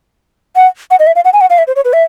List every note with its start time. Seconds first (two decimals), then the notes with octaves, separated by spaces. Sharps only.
0.56 F#5
0.91 F#5
0.99 D#5
1.07 E5
1.16 F5
1.25 F#5
1.33 G#5
1.41 F#5
1.50 F5
1.58 E5
1.67 C5
1.76 C#5
1.85 B4
1.93 E5